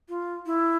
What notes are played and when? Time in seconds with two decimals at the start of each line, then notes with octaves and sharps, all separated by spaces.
0.09 F4
0.46 E4